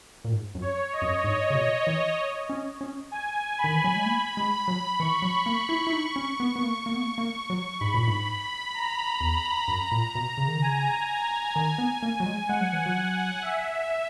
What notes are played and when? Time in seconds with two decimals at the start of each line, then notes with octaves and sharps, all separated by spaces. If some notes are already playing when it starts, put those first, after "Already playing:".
0.25 A#2
0.31 G#2
0.55 F#2
0.62 C#5
0.93 D#5
1.02 F#2
1.24 G#2
1.50 C#3
1.55 B2
1.87 E3
2.50 C#4
2.81 C#4
3.12 G#5
3.58 B5
3.64 D#3
3.75 E3
3.84 F#3
3.96 G#3
4.06 A#3
4.37 G#3
4.68 F#3
4.99 E3 C#6
5.22 F#3
5.46 A#3
5.69 E4
5.87 E4
5.93 D#4
6.16 C#4
6.40 B3
6.56 B3
6.63 A#3
6.86 A#3
6.94 B3
7.01 A#3
7.18 A#3
7.50 F#3
7.80 G#2 B5
7.94 A#2
8.07 G#2
8.74 A#5
9.05 A#5
9.20 E2
9.37 B5
9.68 F#2 A#5
9.92 A#2
10.15 B2
10.38 C#3
10.48 D#3
10.57 C#3 G#5
11.56 D#3
11.78 B3
12.03 A#3
12.20 F#3
12.26 G#3
12.48 G#3 F#5
12.61 F#3
12.73 E3
12.86 F#3
12.95 F#5
13.42 E5